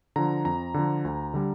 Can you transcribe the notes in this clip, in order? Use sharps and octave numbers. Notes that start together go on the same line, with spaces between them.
D3 F3 A#5
F2 A#5
D3 F3
D2
D3 G3